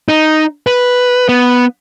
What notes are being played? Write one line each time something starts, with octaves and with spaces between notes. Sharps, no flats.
D#4
B4
B3